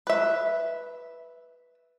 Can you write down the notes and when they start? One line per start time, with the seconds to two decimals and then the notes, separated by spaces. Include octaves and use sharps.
0.07 B4 E5